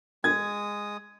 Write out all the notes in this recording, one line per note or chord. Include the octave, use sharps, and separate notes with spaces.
G#3 D#6 G#6